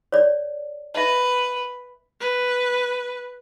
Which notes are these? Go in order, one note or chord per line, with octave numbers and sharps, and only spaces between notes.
C#5 D5
B4 D#5 E5
B4